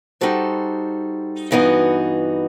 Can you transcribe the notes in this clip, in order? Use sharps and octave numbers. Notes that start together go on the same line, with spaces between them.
G3 D#4 F#4 A4 C5
G2 E3 B3 D#4 F#4